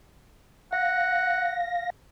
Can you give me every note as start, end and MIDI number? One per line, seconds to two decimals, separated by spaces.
0.73 1.90 77
0.73 1.61 78
0.73 1.90 94